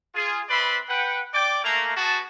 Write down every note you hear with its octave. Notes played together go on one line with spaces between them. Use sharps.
F4 G#4
C4 B4 D5 E5 B5 C6
B4 F#5 G5
D5 G5 D6
A3 A#3 A#5
B3 F#4 G#4 A5